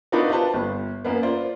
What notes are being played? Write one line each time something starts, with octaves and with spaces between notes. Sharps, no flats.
B3 D4 D#4 F4 F#4 B4
F4 G4 B4 C5 A5
G1
F#2 A#3 B3
F4 C5 D5